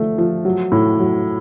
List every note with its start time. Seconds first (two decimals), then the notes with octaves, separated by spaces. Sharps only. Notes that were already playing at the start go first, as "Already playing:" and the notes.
Already playing: D3 F3 A3
0.18 F3
0.45 F#3
0.72 A2
1.00 F#3